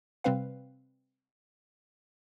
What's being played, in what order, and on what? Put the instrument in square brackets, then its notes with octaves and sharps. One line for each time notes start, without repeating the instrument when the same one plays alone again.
[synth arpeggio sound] C3 G3 C4 B4 F5